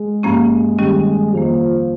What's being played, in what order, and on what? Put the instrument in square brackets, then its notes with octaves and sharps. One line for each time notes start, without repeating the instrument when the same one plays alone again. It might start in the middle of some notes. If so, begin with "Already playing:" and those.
Already playing: [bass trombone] G#3
[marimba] G2 F3 A#3 C#4
G2 D#3 G3 C#4 G4
[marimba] F2 D#3 A#3 [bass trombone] F3